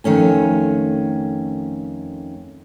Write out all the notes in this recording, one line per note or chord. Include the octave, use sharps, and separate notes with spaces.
F2 D#3 A3 C#4 G#5